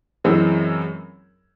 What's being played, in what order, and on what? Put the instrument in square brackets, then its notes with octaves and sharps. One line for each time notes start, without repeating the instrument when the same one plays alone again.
[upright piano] F#2 E3 G#3 C4